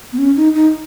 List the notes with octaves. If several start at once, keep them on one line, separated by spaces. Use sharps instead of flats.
B3
C#4
D#4
D#4